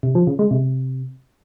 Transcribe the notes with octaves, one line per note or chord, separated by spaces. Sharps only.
C3
F3
C#3
G#3
C3